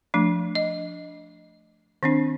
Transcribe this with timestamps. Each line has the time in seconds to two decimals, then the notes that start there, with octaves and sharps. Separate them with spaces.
0.14 F3 A3 D4
0.55 D#5
2.03 D#3 C4 D4